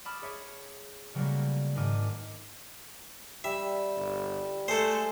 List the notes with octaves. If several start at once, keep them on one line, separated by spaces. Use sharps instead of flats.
A5 B5 D6 D#6 F6
G#4 C#5 E5
C#3 F#3 G3 A3 A#3
G#1 G#2 A#4 D6 D#7
G3 E5
G1
G#3 A3 A4 C5